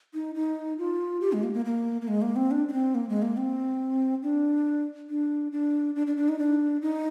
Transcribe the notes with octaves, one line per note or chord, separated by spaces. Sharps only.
D#4
D#4
F4
G4
G#3
A#3
A#3
A#3
A#3
G#3
A#3
C4
D4
D4
C4
A#3
G#3
A#3
C4
D4
D4
D4
D4
D4
D4
D#4
D4
D#4